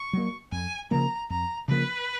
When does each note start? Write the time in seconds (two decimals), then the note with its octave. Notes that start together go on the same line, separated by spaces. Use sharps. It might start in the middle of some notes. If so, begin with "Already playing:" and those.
Already playing: C#6
0.13 F#3 A#3
0.52 F2 G#5
0.91 C#3 F3 A#3 A#5
1.30 F2 A#5
1.68 C#3 F3 A#3 B4